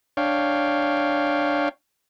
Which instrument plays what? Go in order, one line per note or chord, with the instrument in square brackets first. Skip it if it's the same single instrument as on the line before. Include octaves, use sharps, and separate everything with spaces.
[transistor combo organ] D4 C#5 F5 G5